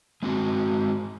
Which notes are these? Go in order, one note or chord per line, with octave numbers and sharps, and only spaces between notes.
G#3 C4 F#4